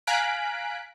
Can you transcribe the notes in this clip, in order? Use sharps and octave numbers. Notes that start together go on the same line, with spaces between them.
F5 G#5 A#5 F#6 B6 D7